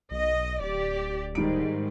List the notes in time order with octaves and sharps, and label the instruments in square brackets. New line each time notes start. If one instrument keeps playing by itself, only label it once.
[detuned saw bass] B1 [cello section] D#5
[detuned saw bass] D1 [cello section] G4 D5
[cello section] G#2 [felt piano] D#3 G3 D7